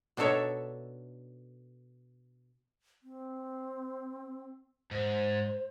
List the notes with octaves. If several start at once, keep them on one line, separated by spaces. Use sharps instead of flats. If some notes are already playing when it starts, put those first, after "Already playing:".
B2 D4 D#4 A4 C#5 E5
C4
G#2 C5